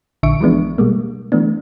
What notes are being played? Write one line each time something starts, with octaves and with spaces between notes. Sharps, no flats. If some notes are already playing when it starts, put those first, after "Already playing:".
A#1 D3 E5 C#6 D7
E3 F3 G#3 B3 D4
B2 G3 G#3 A#3
E3 A3 B3 D4